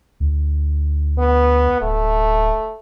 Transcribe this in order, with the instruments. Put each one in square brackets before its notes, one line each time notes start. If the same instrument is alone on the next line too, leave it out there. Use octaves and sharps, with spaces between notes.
[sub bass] D2
[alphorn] B3
[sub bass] D1 [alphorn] A3